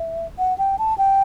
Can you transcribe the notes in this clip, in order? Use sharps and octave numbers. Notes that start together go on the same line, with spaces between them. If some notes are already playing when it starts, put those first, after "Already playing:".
Already playing: E5
F#5
G5
A5
G5